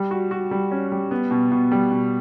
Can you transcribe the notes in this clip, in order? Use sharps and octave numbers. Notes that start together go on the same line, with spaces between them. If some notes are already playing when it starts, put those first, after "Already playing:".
Already playing: G3
F#4
F#4
G3
C#4
G3
B3
B2
B2
G3
B2